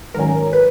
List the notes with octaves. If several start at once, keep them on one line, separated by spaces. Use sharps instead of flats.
G#2 D#3 F#3 C#4 A#4
B4